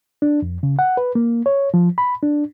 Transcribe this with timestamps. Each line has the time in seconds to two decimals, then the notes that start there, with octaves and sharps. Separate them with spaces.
0.22 D4
0.42 F2
0.63 C#3
0.79 F#5
0.97 B4
1.15 A#3
1.46 C#5
1.74 F3
1.98 B5
2.23 D4